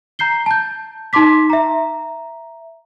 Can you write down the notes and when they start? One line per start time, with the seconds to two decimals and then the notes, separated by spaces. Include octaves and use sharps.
0.19 A#5 G6 C7 G7
0.46 A5 G6
1.13 D#4 A5 C6 D6 B6
1.50 E5 A#5